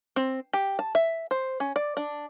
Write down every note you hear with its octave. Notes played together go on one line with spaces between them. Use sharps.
C4
G4
A5
E5
C5
C#4
D5
D4